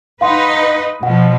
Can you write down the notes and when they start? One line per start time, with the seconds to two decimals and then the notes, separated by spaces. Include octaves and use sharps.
0.21 D#4 B4 F5 F#5 C6
1.03 B2 F3 F#5